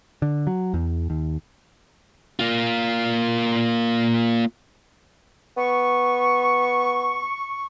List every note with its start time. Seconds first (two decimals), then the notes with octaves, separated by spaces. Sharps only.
0.22 D3
0.47 F#3
0.74 E2
1.10 D#2
2.40 A#3 F4
5.57 B3 C#6